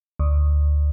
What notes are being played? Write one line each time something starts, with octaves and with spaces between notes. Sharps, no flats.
D2